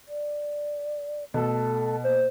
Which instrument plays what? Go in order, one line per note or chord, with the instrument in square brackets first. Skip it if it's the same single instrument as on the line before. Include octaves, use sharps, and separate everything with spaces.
[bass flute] D5
[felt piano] B2 [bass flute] A3 [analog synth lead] A4
[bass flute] A#3 [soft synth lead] C5